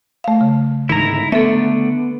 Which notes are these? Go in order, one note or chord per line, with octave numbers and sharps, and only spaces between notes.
A3 F5
C#3
G#2 D3 D#3 E4 A#5
D3 A3 B3 A4 E5